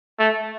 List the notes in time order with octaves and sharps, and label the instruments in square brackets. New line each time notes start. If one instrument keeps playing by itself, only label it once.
[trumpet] A3